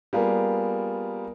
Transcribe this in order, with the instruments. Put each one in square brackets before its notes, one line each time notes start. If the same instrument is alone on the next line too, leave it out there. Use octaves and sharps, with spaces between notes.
[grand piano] G3 A#3 B3 F4 G#4 A#4